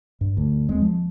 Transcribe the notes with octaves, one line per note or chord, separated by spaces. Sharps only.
G2
D2
D#2 G#3 C4
F3